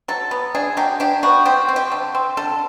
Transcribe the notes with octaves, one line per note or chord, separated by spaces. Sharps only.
F#3 A4
B3
D4 G#4
F#3 G4
D4 G4
B3 F#4
C4 G4
C4
G4
D3
C4
D3 A4